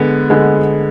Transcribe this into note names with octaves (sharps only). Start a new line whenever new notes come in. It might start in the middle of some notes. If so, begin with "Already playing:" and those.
Already playing: D3 G#3 B3
D3 G#3 B3